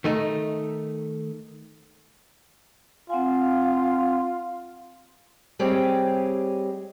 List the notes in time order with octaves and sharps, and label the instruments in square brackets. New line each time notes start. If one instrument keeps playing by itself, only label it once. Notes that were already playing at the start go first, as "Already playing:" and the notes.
[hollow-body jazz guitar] D#3 A3 D#4
[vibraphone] C4 F#5 G#5 [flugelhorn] F4 [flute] F5
[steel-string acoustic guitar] G3 C4 G4 G#4 C#5 D#5